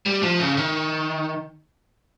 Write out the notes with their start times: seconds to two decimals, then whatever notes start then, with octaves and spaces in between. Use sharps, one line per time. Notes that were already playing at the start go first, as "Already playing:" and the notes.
0.06 G3
0.23 F3
0.39 C#3
0.57 D#3